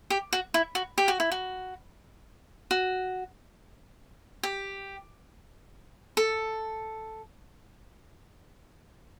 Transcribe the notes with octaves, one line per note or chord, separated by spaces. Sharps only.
G4
F#4
E4
F#4
G4
F#4
E4
F#4
F#4
G4
A4